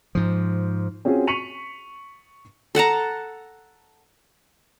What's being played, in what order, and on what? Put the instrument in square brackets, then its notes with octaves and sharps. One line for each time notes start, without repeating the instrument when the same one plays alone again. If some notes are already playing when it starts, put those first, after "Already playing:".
[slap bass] G#2 F3
[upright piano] C4 C#4 F4 F#4 G#4
C#6 B6 C#7 D#7 F7 F#7
[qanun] A4 F#5 A5 A#5